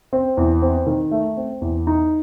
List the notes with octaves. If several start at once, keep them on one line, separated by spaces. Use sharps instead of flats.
C4
E2
C4
D#3
A3
C4
E2
D#4